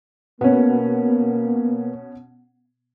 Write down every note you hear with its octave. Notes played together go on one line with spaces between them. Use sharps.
B2 A#3 B3 C#4